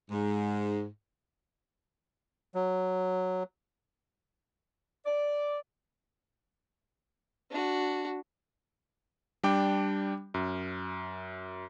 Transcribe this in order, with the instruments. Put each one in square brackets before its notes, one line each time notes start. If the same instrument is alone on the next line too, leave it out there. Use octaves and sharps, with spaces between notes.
[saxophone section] G#2
[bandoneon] F#3
[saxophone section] D5
[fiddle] D4 F#4
[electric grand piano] G3 D4 G5 D6
F#2